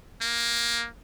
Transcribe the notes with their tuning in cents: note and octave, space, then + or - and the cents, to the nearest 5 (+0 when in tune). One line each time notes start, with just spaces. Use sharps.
A#3 +10